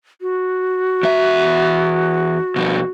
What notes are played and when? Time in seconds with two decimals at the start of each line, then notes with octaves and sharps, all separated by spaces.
0.21 F#4
1.03 E2 E5
2.56 B2 F3